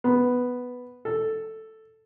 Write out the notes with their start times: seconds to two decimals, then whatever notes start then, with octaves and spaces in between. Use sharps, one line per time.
0.04 B3
1.05 A4